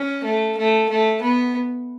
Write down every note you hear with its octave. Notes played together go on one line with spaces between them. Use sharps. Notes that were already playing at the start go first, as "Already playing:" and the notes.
Already playing: C#4
A3
A3
A3
B3